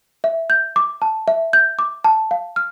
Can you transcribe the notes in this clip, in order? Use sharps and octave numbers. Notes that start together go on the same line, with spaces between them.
E5
G6
D6
A5
E5
G6
D6
A5
F5
F6